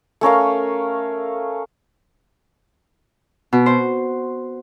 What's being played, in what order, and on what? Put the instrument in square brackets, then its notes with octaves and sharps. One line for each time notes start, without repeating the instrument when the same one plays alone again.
[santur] A3 C#4 A#4 F5
[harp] B2
C5